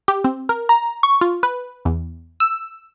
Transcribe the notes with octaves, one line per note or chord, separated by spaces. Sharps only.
G4
C4
A#4
A#5
C#6
F4
B4
E2
E6